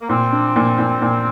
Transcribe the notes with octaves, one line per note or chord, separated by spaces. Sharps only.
A#3
A#2 C4
D4
A#2
A#2
A#2